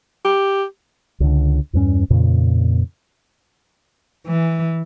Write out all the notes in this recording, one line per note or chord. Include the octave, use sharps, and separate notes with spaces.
G4
C#2 D3
E2 G2 C#4
F2 A#2 C#3
E3